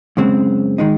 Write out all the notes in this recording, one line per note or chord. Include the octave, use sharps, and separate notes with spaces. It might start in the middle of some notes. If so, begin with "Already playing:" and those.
F#2 C#3 G#3 C4
D#3 G#3 D#4